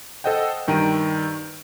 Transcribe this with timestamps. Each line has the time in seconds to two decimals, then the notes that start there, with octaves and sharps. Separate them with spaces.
0.24 A4 C5 D#5 F#5 G5
0.67 G2 D#3 G5 A#5 D7 D#7